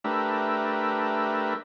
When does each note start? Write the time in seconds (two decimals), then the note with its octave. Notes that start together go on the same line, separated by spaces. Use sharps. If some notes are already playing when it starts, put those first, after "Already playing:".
0.04 A3 D4 G4 A#4 B4 E5